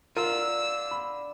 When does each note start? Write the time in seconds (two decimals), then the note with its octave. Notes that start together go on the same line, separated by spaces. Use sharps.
0.16 D3 F4 A#4 E6
0.91 B5